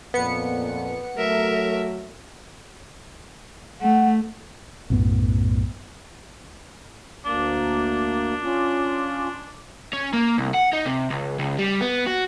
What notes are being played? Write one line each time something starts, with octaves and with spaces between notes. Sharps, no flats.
F2 A#2 B3 C#7
F#3 A3 A#4 E5
A3 F#5
B1 F#2 A2 B3
D2 A#3 D4
C#4 F4
C#4
A#3
C2
F#5
D#4
C3
C#2
C#2
G3
B3
F#4